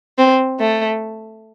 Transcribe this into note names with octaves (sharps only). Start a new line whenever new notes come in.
C4
A3